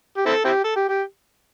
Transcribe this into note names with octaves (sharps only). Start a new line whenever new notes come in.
G4
C4 E4 A4
C4 E4 G4
A4
G4
G4